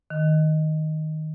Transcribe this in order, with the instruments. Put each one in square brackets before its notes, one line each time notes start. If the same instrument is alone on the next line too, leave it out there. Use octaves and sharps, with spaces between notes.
[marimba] D#3